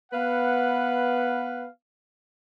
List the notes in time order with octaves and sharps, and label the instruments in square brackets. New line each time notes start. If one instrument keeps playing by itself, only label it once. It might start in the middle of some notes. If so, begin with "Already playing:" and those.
[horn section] B3 B4 F5 F#5